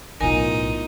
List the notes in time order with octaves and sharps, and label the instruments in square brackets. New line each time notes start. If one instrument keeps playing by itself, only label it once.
[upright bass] B1 A2 [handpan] E3 B3 F4 [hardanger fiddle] D#4 [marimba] A#4 G#5